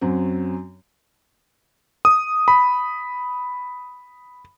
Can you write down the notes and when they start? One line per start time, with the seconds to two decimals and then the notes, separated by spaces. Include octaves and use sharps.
0.01 F#2 F#3 C4
2.05 D#6
2.48 B5